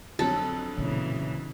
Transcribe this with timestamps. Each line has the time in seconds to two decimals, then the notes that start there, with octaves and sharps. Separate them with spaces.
0.19 F2 D3 F#3 A4
0.77 B1 A#2 C#3 E3